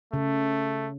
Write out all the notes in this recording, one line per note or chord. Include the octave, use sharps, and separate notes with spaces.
C#3 A3